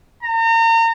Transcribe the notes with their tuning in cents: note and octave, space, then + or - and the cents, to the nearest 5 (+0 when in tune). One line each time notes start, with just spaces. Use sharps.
A#5 -35